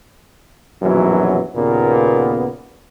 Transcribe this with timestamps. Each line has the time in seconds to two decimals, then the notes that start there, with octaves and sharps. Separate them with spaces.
0.82 A#1 F#2 B2 D#3 E3 F#3
1.56 D#2 A#2 C#3 A#3 B3